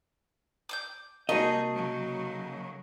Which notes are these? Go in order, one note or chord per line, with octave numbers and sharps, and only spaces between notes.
D6 D#6 G6
C3 G3 A3 A#3 D#4 F#4 G#4 D#5
C#3 F#3